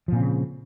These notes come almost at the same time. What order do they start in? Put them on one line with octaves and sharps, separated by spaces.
F3 A#2 C4 C#3